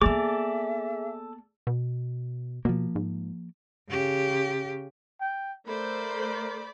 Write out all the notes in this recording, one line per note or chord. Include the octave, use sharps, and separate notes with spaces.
A#3 B3 G#4 A4 D5 E5 D6
B2
B2 F3 A#3
G#2
C#3 G4
G5
A3 A#4 C5 D5 B5